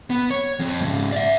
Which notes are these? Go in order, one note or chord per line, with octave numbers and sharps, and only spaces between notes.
B3
C#5
F2
G#2 C#3
D5 E5